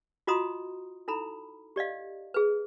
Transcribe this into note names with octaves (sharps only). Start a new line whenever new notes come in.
F4 F#4 D#5 A#5 C6 D#6
D#4 E4 A4 A#5 B5
G4 D5 D#5 F5
G#4 B4